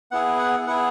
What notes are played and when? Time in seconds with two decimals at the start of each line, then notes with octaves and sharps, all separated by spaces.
0.11 B3 E4 G#4 F#5
0.39 F#5
0.66 B3 E4 G#4 F#5